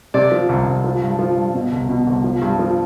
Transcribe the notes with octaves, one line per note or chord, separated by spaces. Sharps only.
C3 D5
F3
C2
C2
F3
G2
F3
G2
B2
C2
B2
C2
F3
G2
F3